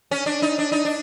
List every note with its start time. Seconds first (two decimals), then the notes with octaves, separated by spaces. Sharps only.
0.11 C#4
0.26 D4
0.42 D#4
0.59 D4
0.72 D#4
0.85 D4